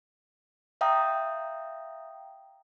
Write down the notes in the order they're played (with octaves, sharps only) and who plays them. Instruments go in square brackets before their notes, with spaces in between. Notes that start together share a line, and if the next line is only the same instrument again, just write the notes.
[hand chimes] E5 F5 G5 A#5 D#6